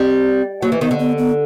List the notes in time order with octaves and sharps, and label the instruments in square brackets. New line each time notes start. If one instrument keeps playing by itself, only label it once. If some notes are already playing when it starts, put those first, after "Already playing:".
Already playing: [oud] G3 [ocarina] C4
[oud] F#3 [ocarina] A#3
[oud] E3
[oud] D#3 [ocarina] B3
[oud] D3
[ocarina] B3
B3